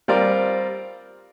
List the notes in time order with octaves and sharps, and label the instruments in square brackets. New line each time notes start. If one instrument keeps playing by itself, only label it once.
[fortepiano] G3 C4 F4 A#4 D5